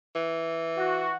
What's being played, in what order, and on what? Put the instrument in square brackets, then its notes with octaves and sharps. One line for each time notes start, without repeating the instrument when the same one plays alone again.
[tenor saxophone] E3
[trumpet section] F#4